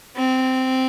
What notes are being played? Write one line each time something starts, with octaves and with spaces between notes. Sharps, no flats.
C4